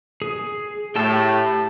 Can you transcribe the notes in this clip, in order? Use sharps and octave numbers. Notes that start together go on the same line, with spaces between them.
G#4
A2 G4 A5 E6